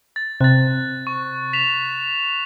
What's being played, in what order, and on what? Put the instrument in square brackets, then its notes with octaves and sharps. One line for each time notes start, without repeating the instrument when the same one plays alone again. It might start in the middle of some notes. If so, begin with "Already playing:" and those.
[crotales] A6
[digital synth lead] C3 [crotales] F#6 A6
[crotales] C#6
B6 E7 F7